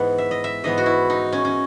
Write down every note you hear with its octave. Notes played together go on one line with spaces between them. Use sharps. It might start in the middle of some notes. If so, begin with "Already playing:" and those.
Already playing: G#2 E3 B3 F#5
E5
D#5
E5
G#2 E3 B3 D#5
F#4
E4
D#4
C#4
C#4